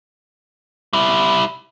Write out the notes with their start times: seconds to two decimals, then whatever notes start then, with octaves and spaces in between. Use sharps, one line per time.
0.93 G3 E4